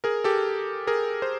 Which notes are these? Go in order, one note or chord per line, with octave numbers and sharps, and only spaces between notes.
G#4 A#4
G4 A4
G#4 A#4
C5